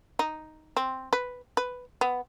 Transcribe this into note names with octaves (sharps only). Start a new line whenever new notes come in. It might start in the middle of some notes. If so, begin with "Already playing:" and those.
D#4
C4
B4
B4
B3